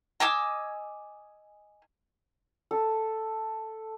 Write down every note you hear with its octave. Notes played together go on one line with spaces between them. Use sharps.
D#5 G#5 D6 E6
A4